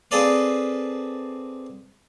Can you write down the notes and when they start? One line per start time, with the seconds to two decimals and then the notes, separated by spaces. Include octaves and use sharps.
0.11 C4 G#4 A4 B4 D5 F5